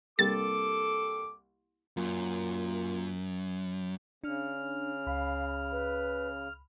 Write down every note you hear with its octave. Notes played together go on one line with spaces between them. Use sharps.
C2 A#3 G4 A4 D6 A6
F#2 A#2
C#3 D4 F6
C#2 F5 B5
B4